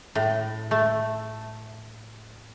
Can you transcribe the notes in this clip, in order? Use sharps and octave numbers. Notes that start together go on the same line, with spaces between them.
A2
A3